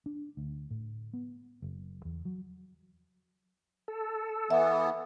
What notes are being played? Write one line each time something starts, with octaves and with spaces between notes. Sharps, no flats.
D4
D2
A2
B3
F#1
E2
F#3
A4
E3 B3 E5